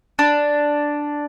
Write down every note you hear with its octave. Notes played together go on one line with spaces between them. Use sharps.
D4